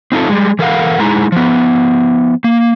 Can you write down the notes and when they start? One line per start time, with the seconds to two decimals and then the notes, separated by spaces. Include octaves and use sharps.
0.12 C4 D#4 F4 A4
0.29 G3 G#3
0.59 E3 A4 A#4 F5 F#5
1.00 G#3 D#4 E4 A#5
1.32 F3 B3
2.44 A#3